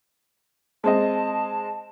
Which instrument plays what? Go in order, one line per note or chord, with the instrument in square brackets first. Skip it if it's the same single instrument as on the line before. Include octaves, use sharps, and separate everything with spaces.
[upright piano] G#3 C4 D#5 [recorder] A5